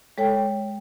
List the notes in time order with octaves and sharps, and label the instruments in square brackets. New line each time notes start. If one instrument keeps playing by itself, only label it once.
[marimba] G#3 A4 C#5 G5